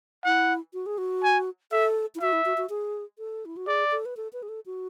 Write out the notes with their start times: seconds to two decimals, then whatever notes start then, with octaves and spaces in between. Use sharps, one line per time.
0.25 E4 F#5
0.74 F#4
0.86 G#4
0.98 F#4
1.24 G#5
1.72 A4 E5
2.15 E4
2.21 F#4 E5
2.33 E4
2.45 F#4
2.57 F#4
2.70 G#4
3.18 A4
3.45 E4
3.57 F#4
3.67 G#4 D5
3.92 A4
4.05 B4
4.17 A4
4.33 B4
4.43 G#4
4.49 A4
4.66 F#4